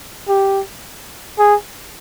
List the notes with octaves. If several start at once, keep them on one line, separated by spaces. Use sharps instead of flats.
G4
G#4